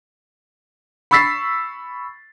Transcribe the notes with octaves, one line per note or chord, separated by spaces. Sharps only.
B5 C#6 E6 A6 B6 C7